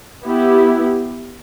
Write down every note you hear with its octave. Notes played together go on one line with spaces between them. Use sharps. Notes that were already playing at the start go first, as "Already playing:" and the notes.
B3 E4 G4